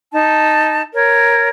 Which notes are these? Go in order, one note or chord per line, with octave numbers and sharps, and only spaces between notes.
D#4 A5
A#4 C#5